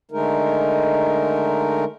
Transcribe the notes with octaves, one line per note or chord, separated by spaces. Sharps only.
D3 G#3 A3 D#4 A#4